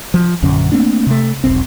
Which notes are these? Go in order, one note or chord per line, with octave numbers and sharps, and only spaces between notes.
F3
A#1 F#2 D3 C#4
A3 A#3 C4 D4
C3 A3
E1 B1 C4